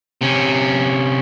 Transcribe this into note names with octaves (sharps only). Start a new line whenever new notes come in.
C3 C#4